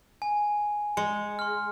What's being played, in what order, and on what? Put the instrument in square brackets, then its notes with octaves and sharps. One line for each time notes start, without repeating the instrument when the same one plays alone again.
[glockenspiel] G#5
[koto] G#3 [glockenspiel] C#7
[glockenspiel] C6 F6